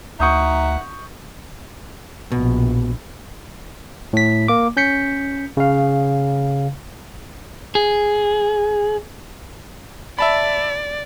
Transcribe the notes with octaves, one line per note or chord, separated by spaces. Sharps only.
D2 D#4 E5 F#5 C#6 D#6 G6
A#1 B2
A2 B6
A#3 D6
C#4 G6 B6 C#7
C#3 F5
G#4
D5 E5 A5 B5